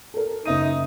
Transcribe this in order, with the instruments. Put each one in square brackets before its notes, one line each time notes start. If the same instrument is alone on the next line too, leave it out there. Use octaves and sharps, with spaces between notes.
[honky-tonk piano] A4 A#4
[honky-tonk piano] F#1 E5 D#7 [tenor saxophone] D#4